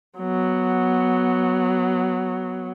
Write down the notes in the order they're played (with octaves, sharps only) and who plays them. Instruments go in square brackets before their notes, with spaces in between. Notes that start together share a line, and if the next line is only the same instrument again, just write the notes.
[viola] F#3 B3